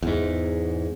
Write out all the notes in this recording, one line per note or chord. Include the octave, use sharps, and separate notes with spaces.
E2 G#2